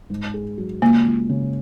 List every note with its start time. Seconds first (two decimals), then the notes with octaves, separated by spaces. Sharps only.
0.10 G#2
0.34 G#4
0.58 F#3
0.82 C#2 A#3
1.06 C#2
1.29 C#3